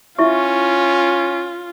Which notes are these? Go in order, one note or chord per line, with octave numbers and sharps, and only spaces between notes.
C#4 E4 F4 E5 C#6